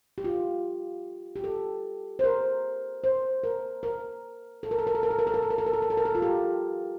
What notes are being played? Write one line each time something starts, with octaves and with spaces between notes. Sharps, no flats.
G4
F4
G4
A4
C5
A#4
C5
A#4
A#4
A4
A#4
A4
A#4
A4
A#4
A4
A#4
A4
A#4
A4
A#4
A4
A#4
A4
A#4
A4
A#4
A4
F4
G4